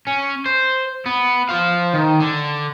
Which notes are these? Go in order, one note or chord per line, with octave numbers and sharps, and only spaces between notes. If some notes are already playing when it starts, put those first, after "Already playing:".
C#4
C5
B3
C5 F5
D#3
D3